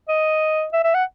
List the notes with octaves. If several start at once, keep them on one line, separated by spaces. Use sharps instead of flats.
D#5
E5
E5
F#5